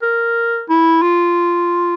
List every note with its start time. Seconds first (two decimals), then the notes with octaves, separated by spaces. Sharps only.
0.02 A#4
0.69 E4
1.02 F4